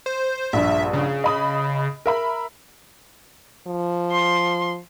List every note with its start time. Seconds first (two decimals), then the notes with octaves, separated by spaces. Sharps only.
0.06 C5
0.53 A#1 G2 E5
0.93 C#3
1.24 D#5 B5 D#6
2.06 A#4 E5 B5
3.67 F3
4.12 C6